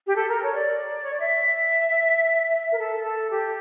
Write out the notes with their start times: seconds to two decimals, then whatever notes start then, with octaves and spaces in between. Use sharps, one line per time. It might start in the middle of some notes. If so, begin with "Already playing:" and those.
0.07 G4
0.16 A4
0.29 A#4
0.42 C#5
0.55 D5
1.02 C#5
1.11 D5
1.20 E5
2.72 A#4
2.78 A4
3.03 A4
3.30 G4